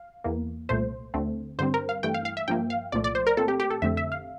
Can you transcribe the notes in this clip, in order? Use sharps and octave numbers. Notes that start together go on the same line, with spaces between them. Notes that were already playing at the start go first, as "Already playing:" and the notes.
Already playing: F5
E2 E3 A#3
C2 A#2 A3 C5
D2 D3 A3 C4
G2 D3 G3 C4 C5
A#4
F5
G2 E3 A3 G5
F5
F5
E5
G2 F3 A#3 G5
F5
C2 A#2 F3 A3 D5
D5
C5
A#4
A#2 A3 C4 A4
G4
G4
A4
F2 D3 A3 C4 E5
E5
F5